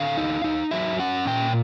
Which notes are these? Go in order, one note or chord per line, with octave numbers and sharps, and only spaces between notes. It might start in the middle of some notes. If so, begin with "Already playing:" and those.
Already playing: D3 F5
D#4
D#4
F#3 E5
C#4 F#5
A#2 G5